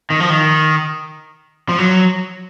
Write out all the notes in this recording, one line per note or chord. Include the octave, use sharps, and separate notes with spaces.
D#3
F3
D#3
F3
F#3